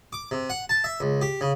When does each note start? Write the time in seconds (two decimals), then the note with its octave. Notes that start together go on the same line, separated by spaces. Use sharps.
0.13 D6
0.31 C3
0.50 F#5
0.69 A5
0.84 E5
1.00 C#2
1.22 G4
1.41 C#3